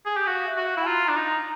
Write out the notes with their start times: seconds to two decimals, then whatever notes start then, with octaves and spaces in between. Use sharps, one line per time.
0.06 G#4
0.17 G4
0.27 F#4 F5
0.47 E5
0.57 F#4
0.67 F5
0.77 E4
0.87 F4 A#5
1.08 D4
1.17 D#4